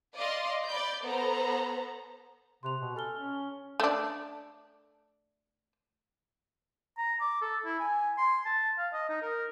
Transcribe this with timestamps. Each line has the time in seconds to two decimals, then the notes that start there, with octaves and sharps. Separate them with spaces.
0.16 D5 D#5 F5 C6
0.68 D5 B5 G6
1.04 B3 A4 C5 A#5
2.63 C3 C6 F#6 F7
2.81 B2
2.96 A4 G#5 F6 G7
3.16 C#4
3.80 A3 D4
6.98 A#5
7.21 D6
7.42 A4
7.65 E4
7.80 G#5
8.18 C6
8.46 A5
8.78 F5
8.93 D#5
9.09 D#4
9.22 A#4